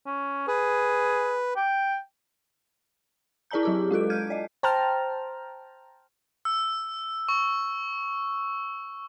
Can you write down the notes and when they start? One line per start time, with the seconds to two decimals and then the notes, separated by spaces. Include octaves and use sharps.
0.06 C#4
0.48 G#4 B4
1.56 G5
3.51 E4 G#4 D5 A5 A#5 G6
3.63 F#3 G4 D6
3.91 G#3 F4 A4 D7
4.10 F6 G6 G#6 D#7
4.30 D5 D#5
4.63 C5 G5 A5 A#5 F6
6.45 E6
7.28 C#6